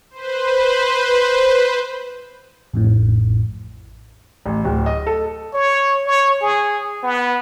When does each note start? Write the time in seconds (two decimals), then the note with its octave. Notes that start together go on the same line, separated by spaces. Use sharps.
0.10 B4 C5
2.74 A1 F2 A2
4.46 A1
4.64 D1
4.86 D#5
5.07 A4
5.53 C#5
6.07 C#5
6.42 G#4
7.03 B3